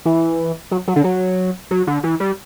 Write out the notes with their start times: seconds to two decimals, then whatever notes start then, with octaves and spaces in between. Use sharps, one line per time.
0.05 E3
0.71 F#3
0.88 F#3
0.96 D3
1.04 F#3
1.71 F#3
1.87 D3
2.03 E3
2.20 G3